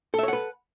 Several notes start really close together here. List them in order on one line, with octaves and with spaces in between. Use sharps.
A4 E5 C#5 F#5 B4